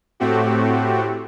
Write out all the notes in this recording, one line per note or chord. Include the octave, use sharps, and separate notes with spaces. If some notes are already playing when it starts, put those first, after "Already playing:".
A2 A3 C4 F#4 G4